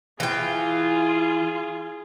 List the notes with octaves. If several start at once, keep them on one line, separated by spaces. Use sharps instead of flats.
E3 F4 G#4 G5